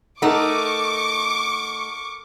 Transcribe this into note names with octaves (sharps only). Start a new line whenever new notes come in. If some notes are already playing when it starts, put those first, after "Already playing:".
A3 D#4 A4 A#4 F#5 C#6 D6